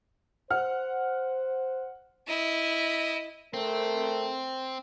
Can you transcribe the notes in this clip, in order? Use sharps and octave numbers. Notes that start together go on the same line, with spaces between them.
C5 F#5 F6
E4 D#5
A3 C4 A#4